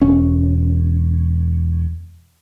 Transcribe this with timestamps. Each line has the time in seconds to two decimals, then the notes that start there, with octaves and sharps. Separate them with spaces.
0.02 E1 C#4